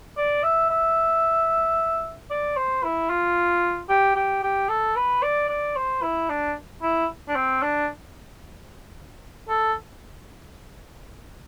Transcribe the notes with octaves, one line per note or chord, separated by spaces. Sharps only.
D5
E5
E5
D5
C5
E4
F4
G4
G4
G4
A4
B4
D5
D5
C5
E4
D4
E4
D4
C4
D4
A4